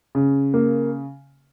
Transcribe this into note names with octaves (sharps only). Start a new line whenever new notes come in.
C#3
A#3